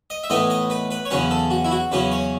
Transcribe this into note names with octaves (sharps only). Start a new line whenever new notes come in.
D#5
E5
A2 E3 B3 D#4 D#5
D#5
B4
B4
C#5
E2 C#3 F#3 C#4 B4
A4
F#4
E4
F#4
E2 C#3 F#3 C#4 B4
C#5